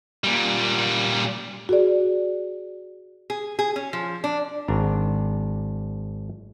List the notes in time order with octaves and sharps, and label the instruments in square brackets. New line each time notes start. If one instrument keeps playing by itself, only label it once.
[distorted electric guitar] A#2 G3
[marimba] F#4 G#4 D5
[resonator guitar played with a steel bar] G#4
G#4
C#4
F3
D4
[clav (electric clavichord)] G#1 D4 A#5